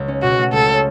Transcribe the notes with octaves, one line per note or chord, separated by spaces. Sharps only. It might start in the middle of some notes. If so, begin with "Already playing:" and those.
Already playing: C#2
C#4
B2 F#4
A3
C#2 A4
C#4